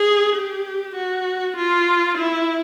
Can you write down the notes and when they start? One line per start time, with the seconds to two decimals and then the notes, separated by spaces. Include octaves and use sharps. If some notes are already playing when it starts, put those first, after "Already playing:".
Already playing: G#4
0.36 G4
0.96 F#4
1.57 F4
2.18 E4